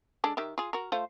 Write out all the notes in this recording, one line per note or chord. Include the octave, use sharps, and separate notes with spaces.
G#3 D4 A4
D#3 G4 E5
F4 G#4
F#4 A#4
A3 F4 C5